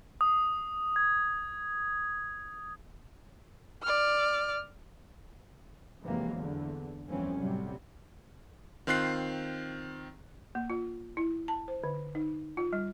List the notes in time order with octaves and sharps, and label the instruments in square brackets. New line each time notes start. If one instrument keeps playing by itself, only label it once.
[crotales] D#6
G#6
[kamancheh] D5 F6
[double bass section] F2 G#2 C3 E3 F#3 A#3
E2 D3
G1 F2 E3 F3 C4 C#4
A2 C3 F#3 G3
[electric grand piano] D#3 C4 F4 F#6 C7
[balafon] A#3
F4
E4
A5
C5
D3
D#4
F4
G3